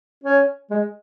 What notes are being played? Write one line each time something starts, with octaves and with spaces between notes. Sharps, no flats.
C#4
G#3